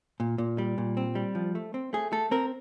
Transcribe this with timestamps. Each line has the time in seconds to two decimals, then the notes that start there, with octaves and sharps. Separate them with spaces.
0.20 A#2
0.38 A#2
0.58 G3
0.78 A#2
0.97 C4
1.15 G3
1.35 F3
1.55 A3
1.74 C4
1.93 A3 G#4
2.12 A3 A4
2.31 C4 A#4